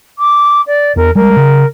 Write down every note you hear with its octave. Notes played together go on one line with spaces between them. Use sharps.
D6
D5
E2 A#4
G3 G#3 A#4
C#3